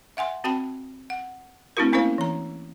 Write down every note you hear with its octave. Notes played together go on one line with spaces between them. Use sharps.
E5 F#5 G#5 C6
C4 F#4 G5 A5 B5
F#5
A3 C4 D4 E4 F#4 A#4
A#3 C#4 E4 A#4 C5 F5
E3 A#5